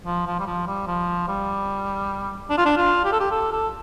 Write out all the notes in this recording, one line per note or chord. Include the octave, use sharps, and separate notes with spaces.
F3
F3
G3
F3
G3
F3
G3
D4
F4
D4
F4
G4
A4
G4
A4
A4